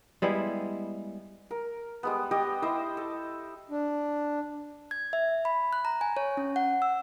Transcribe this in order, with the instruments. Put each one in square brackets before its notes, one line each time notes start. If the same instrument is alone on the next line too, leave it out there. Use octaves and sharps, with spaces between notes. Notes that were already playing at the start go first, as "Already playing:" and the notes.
[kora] G3 G#3 B3 E4
[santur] A#4
G3 G#3 B3
G3 G4 C#5 D#5
E4 C5 D#5
A4
[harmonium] D4
[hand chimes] G#6
E5
B5
F#6
A#5
G#5
C#5
C#4
F#5
E6